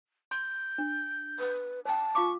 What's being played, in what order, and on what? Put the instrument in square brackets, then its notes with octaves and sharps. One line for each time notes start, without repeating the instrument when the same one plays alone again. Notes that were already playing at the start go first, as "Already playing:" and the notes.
[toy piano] C6 [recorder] G6
[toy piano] D4
[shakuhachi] B4
[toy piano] C5 G5 [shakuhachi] A5
[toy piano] F4 F5 D6 [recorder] C#6